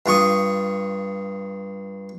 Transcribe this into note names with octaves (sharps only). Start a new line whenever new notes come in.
G2 F4 C#6 D#6